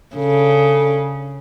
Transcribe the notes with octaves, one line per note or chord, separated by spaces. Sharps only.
C#3 D4 A4